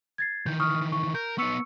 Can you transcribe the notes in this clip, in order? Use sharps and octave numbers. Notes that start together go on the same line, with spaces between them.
G#6 A6 C7
D#3 E3 G6
C#6 D#6 F6
C#6
A#4 G6
B3 D#4 C#6 E6 C#7